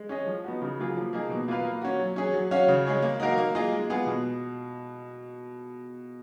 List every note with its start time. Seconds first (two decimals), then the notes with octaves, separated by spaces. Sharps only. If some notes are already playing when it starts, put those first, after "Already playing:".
Already playing: G#3
0.09 C#4 G#4 D#5
0.26 F3
0.44 B3 D#4 F#4
0.62 C#3
0.78 F#3 A#3 F4 G#4
0.96 F3
1.13 A#3 D#4 G#4
1.30 B2
1.48 A#3 F4 B4 F5
1.65 A#3
1.81 C#4 F#4
2.00 F#3
2.16 C#4 G#4
2.34 F#3
2.51 C#4 F#4 C#5 F5
2.68 C#3
2.85 G#3 C#4 G#4 C#5
3.02 A#3
3.20 D#4 F#4 A#4 F5
3.38 A#3
3.55 F4 G#4 D#5
3.72 G#3
3.90 B3 F4 G#4
4.06 B2